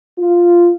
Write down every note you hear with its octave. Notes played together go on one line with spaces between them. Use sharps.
F4